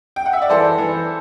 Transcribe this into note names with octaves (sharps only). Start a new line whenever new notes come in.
G5
F#5
E5
D5
E3 A4 C5
E3